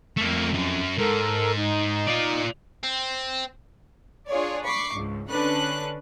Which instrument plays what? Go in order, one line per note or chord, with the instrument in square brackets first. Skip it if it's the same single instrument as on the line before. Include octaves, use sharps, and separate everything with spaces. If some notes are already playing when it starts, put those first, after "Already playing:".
[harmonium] F2 [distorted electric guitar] A3 A#3
[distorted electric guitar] F#2
[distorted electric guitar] G#2 [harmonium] A4 A#4
[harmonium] D#4
[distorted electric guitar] F4 D5
C4
[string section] D4 F4 G#4 C#5 D5
B5 C#6 D6 C7
C#2 G#2
D3 C#4 D4 B4 F#6